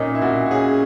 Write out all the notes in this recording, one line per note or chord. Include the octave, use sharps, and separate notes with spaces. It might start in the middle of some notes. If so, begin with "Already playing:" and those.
Already playing: A#2 C#4 D#4 A#4
E4
A#2 F#4
F#4
C#4 G#4